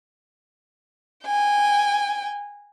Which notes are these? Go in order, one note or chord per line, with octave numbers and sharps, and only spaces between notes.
G5 G#5